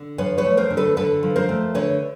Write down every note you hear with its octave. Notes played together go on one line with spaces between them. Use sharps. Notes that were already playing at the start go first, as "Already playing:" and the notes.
Already playing: D3
F3 B4 C#5
B4 C#5
A3
A#4 C5
D3
A4 B4
D3 A4 B4
F3
A#4 C5
A3
D3 B4 C#5